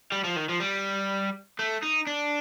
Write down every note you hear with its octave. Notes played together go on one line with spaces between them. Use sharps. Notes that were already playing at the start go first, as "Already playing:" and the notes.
G3
F3
D#3
F3
G3
A3
D#4
D4